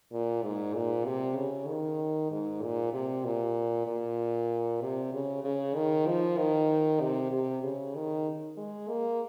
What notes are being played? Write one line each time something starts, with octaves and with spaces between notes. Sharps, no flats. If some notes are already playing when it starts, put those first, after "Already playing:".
A#2
G#2
A#2
C3
C#3
D#3
G#2
A#2
C3
A#2
A#2
C3
C#3
C#3
D#3
F3
D#3
C3
C3
C#3
D#3
G#3
A#3